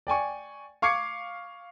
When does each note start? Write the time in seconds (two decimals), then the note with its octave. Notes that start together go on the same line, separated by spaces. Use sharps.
0.07 D5 G5 G#5 C#6
0.82 F5 C#6 D6 G#6 C7 C#7